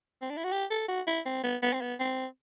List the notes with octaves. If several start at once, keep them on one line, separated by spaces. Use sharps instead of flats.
C4
D4
E4
F#4
G4
A4
F#4
E4
C4
B3
B3
C4
B3
C4